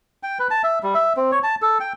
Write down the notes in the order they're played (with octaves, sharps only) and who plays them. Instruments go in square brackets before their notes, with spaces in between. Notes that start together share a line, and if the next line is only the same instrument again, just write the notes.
[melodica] G5
B4
A5
E5
G3
E5
C4
C#5
A5
A4
G5